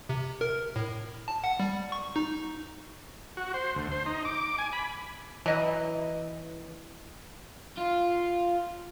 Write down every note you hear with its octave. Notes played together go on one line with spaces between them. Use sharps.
C3
A#4
A2
A5
F#5
G3
C#6
D#4
F#4
C5
D2
C5
D#4
D6
G#5
B5
E3 F#3 D#5
F4